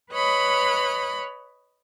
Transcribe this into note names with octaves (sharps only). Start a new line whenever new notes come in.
B4 C#5 D#5 B5 F#6